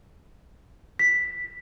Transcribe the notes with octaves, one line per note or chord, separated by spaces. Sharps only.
B6